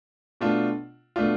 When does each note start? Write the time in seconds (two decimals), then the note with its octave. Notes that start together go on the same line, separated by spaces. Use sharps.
0.41 B2 A3 D4 F4
1.16 B2 A3 D4 F4